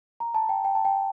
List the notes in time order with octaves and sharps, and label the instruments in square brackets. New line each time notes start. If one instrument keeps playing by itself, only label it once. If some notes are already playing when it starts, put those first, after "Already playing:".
[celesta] A#5
A5
G5
G5
A5
G5